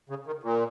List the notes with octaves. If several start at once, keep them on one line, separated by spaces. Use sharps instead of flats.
C#3
D#3
A#2